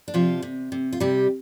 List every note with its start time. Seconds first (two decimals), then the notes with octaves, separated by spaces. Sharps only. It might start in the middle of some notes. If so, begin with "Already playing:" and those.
0.08 D4
0.14 C3 F3 F4
0.42 C3
0.72 C3
0.93 F4
1.00 C3 G3 G4